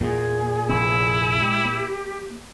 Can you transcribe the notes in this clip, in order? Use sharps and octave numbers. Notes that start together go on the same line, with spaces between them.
E2 A#2 G#4
F1 A#1 C4 E4
G#3 G4
A#3